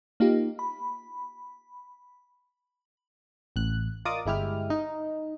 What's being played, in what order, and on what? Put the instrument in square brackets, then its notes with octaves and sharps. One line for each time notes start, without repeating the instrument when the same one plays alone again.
[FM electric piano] A#3 D#4 F4 G4
B5
A1 F#6
F4 A#4 D5 D#5 D6 D#6
G1 G#3 E4 G4 F6
D#4